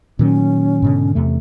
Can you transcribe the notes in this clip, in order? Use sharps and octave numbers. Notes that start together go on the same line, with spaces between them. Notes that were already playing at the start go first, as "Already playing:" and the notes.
A#2 D#3 F#3 C#4
G#2 B2 D3
E2 C3 A3